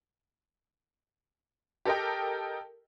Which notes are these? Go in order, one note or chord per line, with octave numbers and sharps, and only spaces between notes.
G4 A4 A#4 D#5 G5